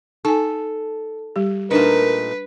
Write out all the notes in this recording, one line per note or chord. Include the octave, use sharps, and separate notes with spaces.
D#4 A4 G#5
G3 G4
A#2 A3 D4 D#4 A#4 B4